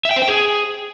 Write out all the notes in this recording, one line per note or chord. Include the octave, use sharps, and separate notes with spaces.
E5
G5
C5
G5
G#4